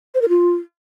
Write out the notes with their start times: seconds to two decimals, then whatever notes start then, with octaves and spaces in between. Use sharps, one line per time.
0.15 C5
0.22 A#4
0.29 F4